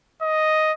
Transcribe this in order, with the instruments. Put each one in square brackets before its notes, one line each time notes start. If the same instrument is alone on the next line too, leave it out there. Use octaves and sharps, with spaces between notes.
[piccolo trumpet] D#5